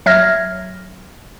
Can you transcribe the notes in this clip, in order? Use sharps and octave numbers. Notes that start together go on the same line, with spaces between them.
F#3 E5 F6 G#6 A#6